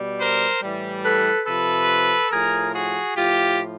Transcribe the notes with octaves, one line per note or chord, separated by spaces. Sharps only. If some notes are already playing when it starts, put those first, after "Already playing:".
Already playing: B2 G3
A#4 C5
A2 E3 G3
A4 B4
C3 F3 A4 B4
A2 F3 G#4 A#4
F#4 G#4
A2 F3 F4 G4